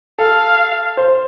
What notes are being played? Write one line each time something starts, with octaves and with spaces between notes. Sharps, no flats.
A4 F5
C5